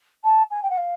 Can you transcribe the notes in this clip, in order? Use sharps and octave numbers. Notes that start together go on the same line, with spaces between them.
A5
G#5
G5
F#5
F5